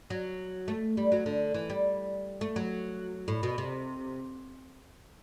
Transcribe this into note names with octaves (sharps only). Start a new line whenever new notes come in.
F#3
A3
G3
F#3
D3
E3
G3
A3
F#3
A2
B2
C3